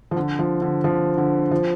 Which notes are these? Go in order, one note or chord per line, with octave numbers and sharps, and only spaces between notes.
F3
D3
F3
D3
F3
D3
F3